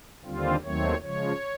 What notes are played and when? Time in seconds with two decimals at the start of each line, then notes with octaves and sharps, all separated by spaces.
0.25 D#2 D3 G3 C4 F4
0.63 D#2 D#3 F#3 A3 C4 C#5
1.02 C#3 F3 G#3 C#5